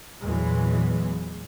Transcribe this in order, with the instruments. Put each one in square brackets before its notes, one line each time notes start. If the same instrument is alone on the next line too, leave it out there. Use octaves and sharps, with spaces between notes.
[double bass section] E2 A#2 E3 F#3 G#3